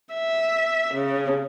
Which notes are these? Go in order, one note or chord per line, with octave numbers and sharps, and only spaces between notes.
E5
C#3